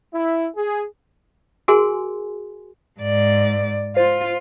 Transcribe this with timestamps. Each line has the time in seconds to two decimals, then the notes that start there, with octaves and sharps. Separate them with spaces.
0.14 E4
0.57 G#4
1.68 F#4 G#4 A#4 G#5 C6
3.00 G#2 D5
3.97 F4 C5